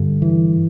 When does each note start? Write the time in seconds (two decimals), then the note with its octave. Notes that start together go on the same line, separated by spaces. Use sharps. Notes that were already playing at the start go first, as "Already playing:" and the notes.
Already playing: G2 D3
0.22 E3